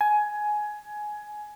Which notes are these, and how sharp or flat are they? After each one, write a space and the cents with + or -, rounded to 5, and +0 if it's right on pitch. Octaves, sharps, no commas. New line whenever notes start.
G#5 +15